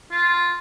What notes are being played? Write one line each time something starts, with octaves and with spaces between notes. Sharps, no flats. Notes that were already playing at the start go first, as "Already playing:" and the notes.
F4